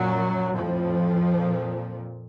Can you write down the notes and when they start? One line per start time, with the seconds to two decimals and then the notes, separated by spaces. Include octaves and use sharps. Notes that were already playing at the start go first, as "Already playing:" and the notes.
Already playing: F#2 A#2 F#3
0.55 F2 A2 F3
1.34 A#2